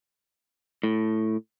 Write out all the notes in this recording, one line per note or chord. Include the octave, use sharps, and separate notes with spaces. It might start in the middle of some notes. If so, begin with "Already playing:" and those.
A2